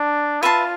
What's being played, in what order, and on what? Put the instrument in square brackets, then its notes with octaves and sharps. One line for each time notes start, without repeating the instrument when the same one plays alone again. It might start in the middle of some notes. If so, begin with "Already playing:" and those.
Already playing: [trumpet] D4
[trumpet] F4 [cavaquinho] B4 E5 A5 C6